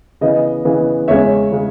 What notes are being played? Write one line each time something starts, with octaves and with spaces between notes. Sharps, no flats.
C#3 E3 B3 D#5
C#3 E3 B3
E2 C#3 G#3 C#4 C#5 E5
C#3 G#3 C#4